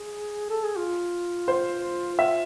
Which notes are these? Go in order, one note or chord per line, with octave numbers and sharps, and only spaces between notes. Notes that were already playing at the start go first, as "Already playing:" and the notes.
Already playing: G#4
A4
G#4
F4
C5
E5